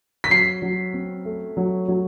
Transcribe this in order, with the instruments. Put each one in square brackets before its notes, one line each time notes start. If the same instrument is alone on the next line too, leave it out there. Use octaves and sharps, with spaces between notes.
[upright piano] B6
[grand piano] F#3 [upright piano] C7
[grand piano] F#3
C4
A3
F#3
F#3